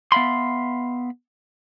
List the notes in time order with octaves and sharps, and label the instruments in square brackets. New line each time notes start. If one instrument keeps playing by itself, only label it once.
[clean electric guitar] B3 E5 F5 B5 C6